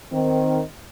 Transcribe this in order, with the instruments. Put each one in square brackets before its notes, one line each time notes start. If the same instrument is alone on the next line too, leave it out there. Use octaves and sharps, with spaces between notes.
[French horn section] D#3 C4